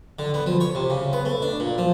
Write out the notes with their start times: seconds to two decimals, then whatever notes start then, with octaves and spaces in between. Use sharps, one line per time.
0.19 D3
0.34 B3
0.46 F3
0.61 C#5
0.75 C3
0.90 C#3
1.13 B3
1.25 A3
1.42 D4
1.60 A#2
1.78 F3